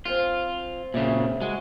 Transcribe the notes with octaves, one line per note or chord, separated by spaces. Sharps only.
C4 F4 F5 G#5
A#2 C#3 E5
G#3 F#4